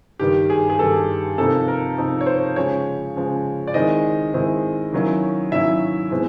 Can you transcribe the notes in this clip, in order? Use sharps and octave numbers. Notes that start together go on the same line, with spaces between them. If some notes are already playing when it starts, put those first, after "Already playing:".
G2 D#3 G3 G4
G#4
G#4
G2 D#3 G3 A4
C3 F3 A#3 D#4 A4
A#4
C3 F3 A#3 D#4
C#5
C5
C#3 F3 G#3 C#5
C#3 F3 G#3
D5
D#3 G#3 C4 E4 D#5
D#3 G#3 C4 E4
D#3 F#3 A#3 C#4 E4
D#3 F#3 A#3 C#4 E4 E5
B2 G#3 C4 E4